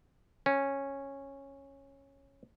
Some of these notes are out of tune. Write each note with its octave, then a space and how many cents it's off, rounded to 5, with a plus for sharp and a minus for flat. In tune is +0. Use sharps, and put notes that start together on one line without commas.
C#4 -10